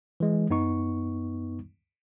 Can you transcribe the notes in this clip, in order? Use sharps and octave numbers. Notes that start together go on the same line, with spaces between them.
E3 G#3
F#2 B3 D#4 C#6